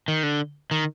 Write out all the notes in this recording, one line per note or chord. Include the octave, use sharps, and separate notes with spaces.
D#3
D3
D#3